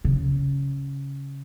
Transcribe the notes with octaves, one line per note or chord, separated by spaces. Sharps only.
C#3